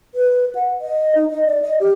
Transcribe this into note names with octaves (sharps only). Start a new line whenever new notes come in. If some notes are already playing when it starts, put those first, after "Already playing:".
B4
F#5
D#5
D#4
D#5
D5
D#5
G4